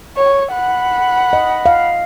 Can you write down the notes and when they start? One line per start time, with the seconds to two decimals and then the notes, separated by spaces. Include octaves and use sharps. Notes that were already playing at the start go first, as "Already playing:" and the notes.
0.17 C#5
0.53 F#5 B5
1.33 D#5
1.66 F5